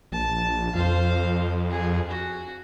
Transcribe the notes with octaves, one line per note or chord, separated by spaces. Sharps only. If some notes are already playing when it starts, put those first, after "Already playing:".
A#1 A5
F2 C5 F5
G#4
F#4